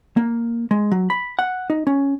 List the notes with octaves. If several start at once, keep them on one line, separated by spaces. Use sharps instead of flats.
A#3
G#3
F#3
B5
F#5
D#4
C#4